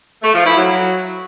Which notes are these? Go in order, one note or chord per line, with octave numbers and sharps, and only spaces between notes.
A3
F3
E4
F#3